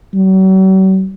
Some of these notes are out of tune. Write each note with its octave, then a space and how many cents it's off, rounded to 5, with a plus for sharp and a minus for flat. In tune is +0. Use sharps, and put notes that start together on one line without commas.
F#3 +45